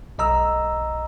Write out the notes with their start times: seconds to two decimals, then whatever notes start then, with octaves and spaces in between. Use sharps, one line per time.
0.18 B1 D#5 A#5 E6